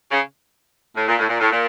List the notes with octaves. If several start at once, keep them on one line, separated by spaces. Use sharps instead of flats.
C#3
A2
A#2
A2
A#2
A2
A#2